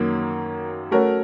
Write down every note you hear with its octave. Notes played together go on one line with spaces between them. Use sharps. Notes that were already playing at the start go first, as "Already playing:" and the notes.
Already playing: F#2 D#3 F#3 A#3
A3 C#4 F#4 A#4